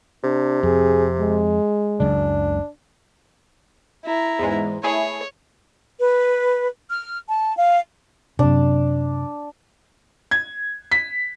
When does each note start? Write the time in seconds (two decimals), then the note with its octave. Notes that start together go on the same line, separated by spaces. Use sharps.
0.24 C3 D4
0.63 F2 G#4
1.20 G#3
2.00 F#1 C#2 F#2 D4
4.05 E4 A#5
4.39 E2 G#2 G#3
4.83 A3 E4 G#4 C#5
5.99 B4
6.89 F6
7.28 A5
7.57 F5
8.39 F#2 C3 D4
10.31 G#6
10.92 B6